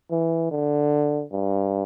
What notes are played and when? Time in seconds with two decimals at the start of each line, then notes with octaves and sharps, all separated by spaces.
0.11 E3
0.51 D3
1.32 G2